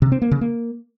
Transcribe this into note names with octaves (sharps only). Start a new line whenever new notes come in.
C3
C4
A#3
C#3
A#3